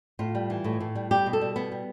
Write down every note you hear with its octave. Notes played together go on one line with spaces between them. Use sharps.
A2 F4
G3
E3
A2
A2
G3
G3 G4
B2
A4
G3
B2 B3
G3